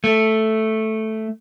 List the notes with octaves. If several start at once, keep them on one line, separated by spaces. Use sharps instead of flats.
A3